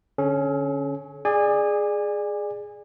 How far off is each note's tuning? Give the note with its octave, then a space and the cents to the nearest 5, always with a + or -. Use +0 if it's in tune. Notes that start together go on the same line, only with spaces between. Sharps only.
D3 +0 C#4 +0 A4 -45
G#4 +0 D5 +20 G#5 -25